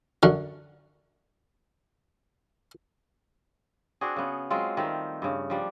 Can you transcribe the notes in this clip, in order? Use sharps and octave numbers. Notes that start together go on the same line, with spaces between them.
F#2 D3
C4 D4 F#4 G#4
C#3 B3
F#3 G#3 C4 F4
D#3 G3 A3 C4
G2 C#3
F3 G3 D4